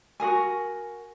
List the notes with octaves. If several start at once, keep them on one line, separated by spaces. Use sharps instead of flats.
F#4 G#4 A#4 G#5